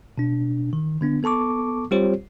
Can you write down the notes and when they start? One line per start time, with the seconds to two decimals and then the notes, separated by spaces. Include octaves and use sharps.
0.18 B2 D4
0.73 D#3
1.01 D3 B3 D4
1.23 B3 A4 A5 C#6 D6
1.91 G3 C4 F4 G4 C5 C#5